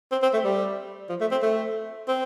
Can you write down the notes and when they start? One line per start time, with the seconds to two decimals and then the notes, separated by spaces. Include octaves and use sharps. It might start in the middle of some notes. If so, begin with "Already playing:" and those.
0.12 C4
0.23 C4
0.33 A3
0.44 G3
1.09 F3
1.21 A3
1.31 C4
1.42 A3
2.08 C4